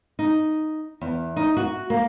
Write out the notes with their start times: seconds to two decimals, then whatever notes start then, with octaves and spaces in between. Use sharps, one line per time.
0.19 D#4
1.01 E2
1.36 D#4
1.57 F#4
1.90 A#3